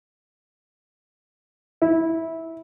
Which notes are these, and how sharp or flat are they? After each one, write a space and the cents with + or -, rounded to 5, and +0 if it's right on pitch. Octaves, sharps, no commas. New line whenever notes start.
E4 -15